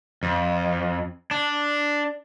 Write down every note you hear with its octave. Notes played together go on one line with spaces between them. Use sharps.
F2
D4